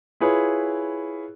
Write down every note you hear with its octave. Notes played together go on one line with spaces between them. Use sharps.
E4 F4 G#4 B4 C#5